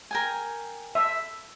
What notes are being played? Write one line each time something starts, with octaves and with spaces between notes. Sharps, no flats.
A#4 G5 G#5
E5